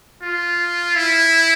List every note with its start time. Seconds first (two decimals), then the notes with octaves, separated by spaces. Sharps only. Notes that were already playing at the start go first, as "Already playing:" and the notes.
0.22 F4
0.96 E4